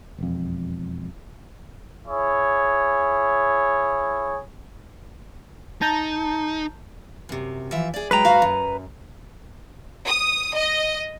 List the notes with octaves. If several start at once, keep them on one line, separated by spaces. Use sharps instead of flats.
E1 F2
E4 G#4 C#5
D#4 A5 A#5 G6
F#2 C3
E3 F3 E5
G#4 D5
F#3 G#3 B4 G5 A#5
G#2 F#4 F5
F#2
D#6
D#5